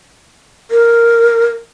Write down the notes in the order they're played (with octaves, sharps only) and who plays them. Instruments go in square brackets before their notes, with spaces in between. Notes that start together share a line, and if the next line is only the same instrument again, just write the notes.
[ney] A#4